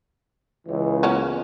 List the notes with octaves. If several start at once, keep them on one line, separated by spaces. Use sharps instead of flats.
C#2 E3
A#3 B3 C#4